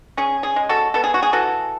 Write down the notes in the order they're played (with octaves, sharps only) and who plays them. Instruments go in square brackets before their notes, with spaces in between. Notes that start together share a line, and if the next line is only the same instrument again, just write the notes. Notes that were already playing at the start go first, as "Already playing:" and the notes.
[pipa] C#4 G#4
G#4
G#3
F#4 A4
B3 A4
G#4
F#4
G#4
E3 F#4 A4